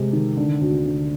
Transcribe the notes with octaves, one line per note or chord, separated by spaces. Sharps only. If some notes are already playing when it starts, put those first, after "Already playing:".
Already playing: C3 G#3
D#3
D3
D2
D3